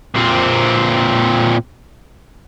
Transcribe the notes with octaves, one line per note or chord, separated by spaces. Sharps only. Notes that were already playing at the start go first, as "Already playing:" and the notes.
A#2 C4